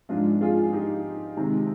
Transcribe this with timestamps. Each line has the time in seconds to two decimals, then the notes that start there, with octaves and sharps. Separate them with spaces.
0.09 G#2 F3 G#3 D4 F4
0.41 F4 G#4
0.73 D#4 G4
1.37 C3 D#3 G#3